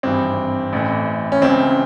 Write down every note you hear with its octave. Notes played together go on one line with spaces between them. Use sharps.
G#1 G2 E3 C4
A1 A2 E3
C#4
C#2 C#3 E3 C4